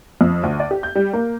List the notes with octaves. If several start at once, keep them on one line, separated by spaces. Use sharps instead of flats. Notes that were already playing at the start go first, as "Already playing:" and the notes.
F2
D2
D5
G4
G6
G3
A#3